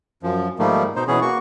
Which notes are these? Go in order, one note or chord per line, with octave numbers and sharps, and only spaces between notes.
F#2 F3
G#2 D#3 F3 G3 A3 A#3
B2 D#4 C5
B2 E3 B3 C#4 G#4
A#3 F#4 C#6